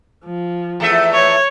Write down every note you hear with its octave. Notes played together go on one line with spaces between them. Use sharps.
F3
E2 A3 E5
C#5